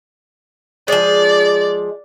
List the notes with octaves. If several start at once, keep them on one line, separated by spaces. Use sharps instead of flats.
F3 G#3 D5